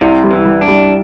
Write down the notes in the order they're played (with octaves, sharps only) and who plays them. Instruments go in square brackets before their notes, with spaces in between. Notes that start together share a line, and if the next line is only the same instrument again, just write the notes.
[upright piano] C2 [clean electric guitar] C3
[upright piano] G3
[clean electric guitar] E3
[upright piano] G3
[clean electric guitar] D4
[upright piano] G3